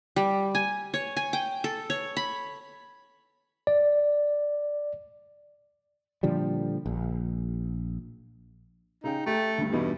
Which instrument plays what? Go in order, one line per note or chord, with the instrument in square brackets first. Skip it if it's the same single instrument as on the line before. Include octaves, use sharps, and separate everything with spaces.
[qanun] G3
G#5
C#5
G#5
G5
A4
C#5
B5
[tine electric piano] D5
[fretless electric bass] A#2 D3 F3 G3
A#1
[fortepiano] C#3 G#4 G5 [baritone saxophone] D#4
[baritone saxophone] A3 [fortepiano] G4 G5
[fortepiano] D2 G2
[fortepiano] E2 B2 D#4 [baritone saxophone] G2